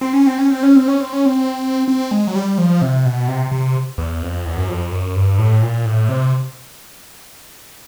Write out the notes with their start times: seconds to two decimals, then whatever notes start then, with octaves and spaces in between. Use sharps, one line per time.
0.01 C4
0.13 C#4
0.27 C4
0.38 C#4
0.51 C4
0.63 C#4
0.76 C4
0.88 C#4
1.00 C4
1.13 C#4
1.26 C4
1.88 C4
2.11 G#3
2.27 F#3
2.35 G3
2.58 F3
2.82 C3
3.05 B2
3.28 C3
3.52 C3
3.98 E2
4.22 F2
4.46 E2
4.57 F#2
4.69 F2
4.92 F#2
5.16 G2
5.38 A2
5.62 A#2
5.85 A2
6.09 C3